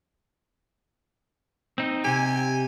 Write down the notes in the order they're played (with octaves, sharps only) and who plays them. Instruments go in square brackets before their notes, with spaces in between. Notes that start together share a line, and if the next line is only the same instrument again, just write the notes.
[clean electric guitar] C4 D#4
[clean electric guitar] C3 G4 [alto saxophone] G#5